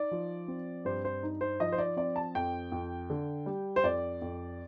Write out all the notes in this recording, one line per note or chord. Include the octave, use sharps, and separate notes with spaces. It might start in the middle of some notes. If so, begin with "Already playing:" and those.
Already playing: D#4 D5
F3
C4
G2 C5
C5
D#4
C5
F3 D#5
C5
D5
C4 D5
A5
F2 G5
F2
D3
G3
C5
F2 D5
F2